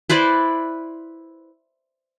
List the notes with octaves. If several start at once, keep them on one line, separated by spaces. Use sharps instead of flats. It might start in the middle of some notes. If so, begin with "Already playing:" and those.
E4 B4 C5 D5